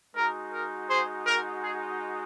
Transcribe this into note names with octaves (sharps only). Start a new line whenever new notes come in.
G#3 D#4 F#4 A#4
A#4
G#4 C5
A#4
G#4